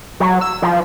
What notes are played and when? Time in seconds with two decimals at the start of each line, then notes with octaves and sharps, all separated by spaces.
0.20 F#3
0.41 E6
0.62 F3